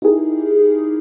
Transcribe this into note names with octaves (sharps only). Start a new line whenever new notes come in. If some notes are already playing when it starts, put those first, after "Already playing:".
D#4 E4 G4 G#4 A#4